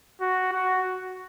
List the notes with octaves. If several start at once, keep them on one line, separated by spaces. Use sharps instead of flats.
F#4
F#4